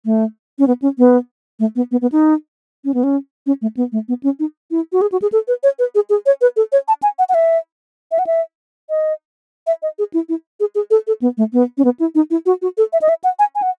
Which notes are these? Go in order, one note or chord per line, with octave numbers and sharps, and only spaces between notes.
A3
C#4
B3
C#4
B3
A3
B3
B3
B3
D#4
C#4
B3
C#4
C#4
A3
B3
A3
B3
C#4
D#4
E4
F#4
G#4
F#4
G#4
A4
B4
C#5
B4
G#4
G#4
C#5
B4
A4
C#5
A5
G#5
F#5
F#5
E5
E5
F#5
E5
D#5
E5
D#5
G#4
E4
E4
G#4
G#4
A4
A4
B3
A3
B3
C#4
B3
E4
D#4
E4
F#4
F#4
A4
E5
D#5
E5
F#5
G#5
G#5
F#5